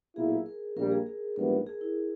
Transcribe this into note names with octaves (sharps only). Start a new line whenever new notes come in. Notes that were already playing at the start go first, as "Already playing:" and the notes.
B1 A#2 A#3 E4 G#4
A#4
A#1 A#2 G3 A#3 A#4
G#4
G#4
A#1 G#2 E3 G3 B3 A#4
G#4
E4